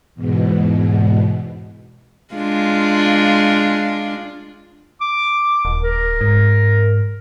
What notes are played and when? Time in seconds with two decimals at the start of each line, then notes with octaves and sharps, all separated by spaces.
0.15 E2 G#2 B2
2.34 G#3 D4 F4
5.01 D6
5.65 D#1
5.82 A#4
6.21 G#2